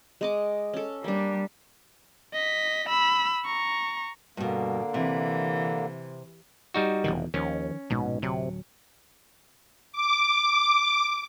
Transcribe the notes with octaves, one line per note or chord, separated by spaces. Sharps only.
G#3 D#5 D6
C#4 A4
G3 A#3 D4
D#5 B6
B5 E6
A#5 C#6
G2 B2 D3 A#3
C3 E3
G3 D#4 F#4
F1 E2 B2 D#3
D#2 D#3 F3 C#4
A#1 G#2 B2
D1 C3 F#3
D6